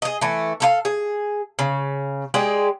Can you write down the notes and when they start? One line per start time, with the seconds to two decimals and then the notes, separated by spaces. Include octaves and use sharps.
0.02 G#4 D#5
0.21 E3 A3
0.60 A4 A#4 F5
0.85 G#4
1.59 C#3
2.34 G#3 G4 G#4 D5